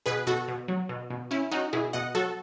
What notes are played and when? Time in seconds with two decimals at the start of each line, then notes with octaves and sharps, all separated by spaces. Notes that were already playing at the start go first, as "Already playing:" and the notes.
0.06 B2 G#4 B4
0.27 B2 F#4 A4
0.48 B2
0.68 F#3
0.89 B2
1.10 B2
1.31 C#4 E4
1.51 C#4 D#4 F#4
1.73 B2 E4 G#4
1.93 B2 D#5 F#5
2.15 F#3 F#4 A4